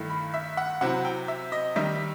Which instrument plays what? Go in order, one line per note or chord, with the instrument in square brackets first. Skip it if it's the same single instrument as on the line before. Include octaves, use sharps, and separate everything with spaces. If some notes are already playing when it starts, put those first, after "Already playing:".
Already playing: [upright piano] G2 D#3 A3 E4
B5
E5
F#5
C3 F#3 C4 E4 F#5
G5
E5
D#5
D#3 G3 D#4 E5